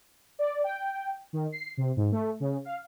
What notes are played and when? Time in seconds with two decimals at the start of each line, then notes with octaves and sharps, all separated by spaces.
0.39 D5
0.64 G5
1.33 D#3
1.52 C7
1.77 C3
1.97 G#2
2.12 A3
2.40 C#3
2.65 F5